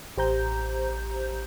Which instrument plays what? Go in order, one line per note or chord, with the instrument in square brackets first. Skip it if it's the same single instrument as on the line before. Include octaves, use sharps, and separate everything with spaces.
[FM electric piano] A1 G4 C5 A#5 G6